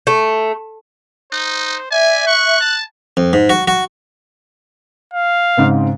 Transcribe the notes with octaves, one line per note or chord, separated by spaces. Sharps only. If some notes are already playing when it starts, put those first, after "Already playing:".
A3
D#4 C5
D5 E5 G#5
C#6 F#6
A5
F2
G#2
F#4
F#4
F5
G#2 C#3 C4